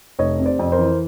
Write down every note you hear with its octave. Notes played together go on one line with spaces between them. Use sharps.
F1 C#5 D#5
C3
C5 D5
F2
A#4 C5
E3